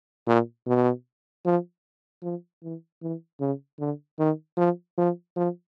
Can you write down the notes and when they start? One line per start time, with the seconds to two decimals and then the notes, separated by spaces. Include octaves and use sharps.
0.27 A#2
0.67 B2
1.45 F3
2.23 F3
2.63 E3
3.02 E3
3.40 C#3
3.79 D3
4.19 D#3
4.57 F3
4.98 F3
5.36 F3